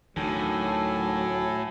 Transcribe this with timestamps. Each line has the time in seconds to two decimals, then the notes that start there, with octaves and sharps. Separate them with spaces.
0.17 D2 A2 D#3 F#3 A4 G#5